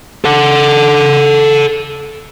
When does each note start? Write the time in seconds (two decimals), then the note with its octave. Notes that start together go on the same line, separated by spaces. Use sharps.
0.24 A4 F#5